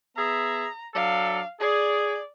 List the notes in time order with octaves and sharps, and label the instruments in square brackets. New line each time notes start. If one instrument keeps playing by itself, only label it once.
[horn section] B3 G#4 E5 [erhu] A#5
[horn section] F#3 D4 A4 [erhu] F5
[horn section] G#4 [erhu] D5